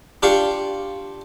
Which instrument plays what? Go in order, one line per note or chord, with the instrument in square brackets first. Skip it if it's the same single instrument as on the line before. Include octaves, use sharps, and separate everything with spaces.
[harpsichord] D4 F4 G4 C6 C#6